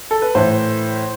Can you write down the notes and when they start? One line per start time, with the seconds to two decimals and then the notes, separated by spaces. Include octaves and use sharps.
0.11 A4
0.22 B4
0.35 A2 E3 C5